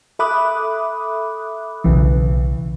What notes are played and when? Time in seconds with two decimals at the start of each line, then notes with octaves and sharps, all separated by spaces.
0.19 A4 E5 B5 D6 D#6 F#6
1.84 B1 C#3 E3